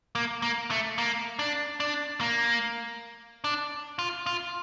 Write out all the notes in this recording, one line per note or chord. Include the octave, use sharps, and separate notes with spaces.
A#3
A#3
A3
A#3
D4
D4
A#3
D4
F4
F4